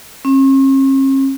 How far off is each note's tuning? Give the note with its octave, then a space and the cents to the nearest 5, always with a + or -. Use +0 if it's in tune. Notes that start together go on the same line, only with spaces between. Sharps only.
C#4 -45